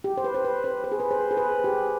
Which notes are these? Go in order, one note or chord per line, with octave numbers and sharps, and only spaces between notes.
G4
C5
B4
C5
B4
C5
B4
G#4
B4
C5
G#4
B4
G4